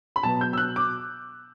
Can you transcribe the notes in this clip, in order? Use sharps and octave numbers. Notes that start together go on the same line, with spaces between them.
B5
B2 F#3 B3 A5
G6
E6
F#6
D6